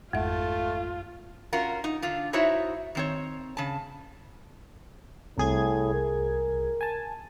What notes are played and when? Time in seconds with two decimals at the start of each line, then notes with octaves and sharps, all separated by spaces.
0.13 G#1 F2 G#3 A3 F4 E5
1.53 C#4 F4 F#4 A#4
1.84 D#4
2.02 D3 F4
2.33 D#4 E4 F#4 C5 C#5 E5
2.95 D#3 C4 C#5
3.57 C#3 A5
5.38 C2 A2 G#4 G#6
5.94 A#4
6.81 G#5 A5